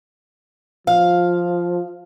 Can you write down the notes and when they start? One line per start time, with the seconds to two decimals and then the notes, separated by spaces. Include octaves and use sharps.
0.87 F3 F5